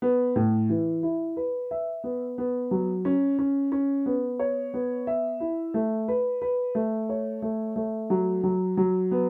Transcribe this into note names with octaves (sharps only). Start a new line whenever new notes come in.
B3
A2
E3
E4
B4
E5
B3
B3
F#3
C#4
C#4
C#4
B3
C#5
B3
E5
E4
A3
B4
B4
A3
C#5
A3
A3
F#3
F#3
F#3
B3